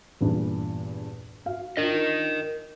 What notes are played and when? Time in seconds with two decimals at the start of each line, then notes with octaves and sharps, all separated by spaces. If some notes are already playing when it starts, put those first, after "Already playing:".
0.21 E2 G2 A#2
1.46 F#4 F5
1.77 D4 F4 A#4 D#5